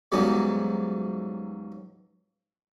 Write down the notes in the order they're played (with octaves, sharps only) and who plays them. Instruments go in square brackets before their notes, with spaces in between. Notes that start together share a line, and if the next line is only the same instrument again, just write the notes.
[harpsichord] C#2 G#2 E3 F#3 G3 B3